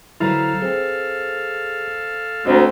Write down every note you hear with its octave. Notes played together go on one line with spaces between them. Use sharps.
D3 F#3 E4 A4 B4 C5 F5 A#5
C4 G#4
D2 C4 D#5 A#5